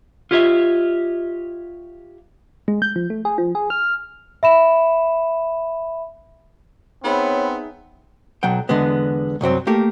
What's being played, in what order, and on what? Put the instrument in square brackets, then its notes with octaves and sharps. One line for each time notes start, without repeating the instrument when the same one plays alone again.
[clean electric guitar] F4 G4 C#5 D#5 E5
[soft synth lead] G#3
G6
F3
A3
G#4
F3
G#4
F6
[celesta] E5 B5 E7
[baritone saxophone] B3 [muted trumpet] C4 [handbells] D#4 G#4 E5 [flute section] C#5 B5
[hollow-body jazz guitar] B1 F#3 F#5 G5
E2 D3 G#3 B3
C2 F#2 F#3 C4
A3 A#3 G4 A#4